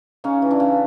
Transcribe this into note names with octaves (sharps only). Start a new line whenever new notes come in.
C#3 C#4 D#4
E3
D4 E4
C#3